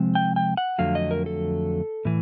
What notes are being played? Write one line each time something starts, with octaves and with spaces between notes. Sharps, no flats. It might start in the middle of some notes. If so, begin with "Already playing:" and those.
Already playing: C3 F3 G#3 C4
G5
G5
F#5
F2 D3 F#3 A3 F5
D#5
A#4
A4
A2 E3